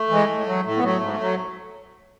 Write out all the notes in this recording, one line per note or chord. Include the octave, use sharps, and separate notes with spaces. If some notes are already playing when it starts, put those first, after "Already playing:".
Already playing: A3
E3 G#3
A2
F#3
A2 A3
B3
F#3 A3
G#2
F#3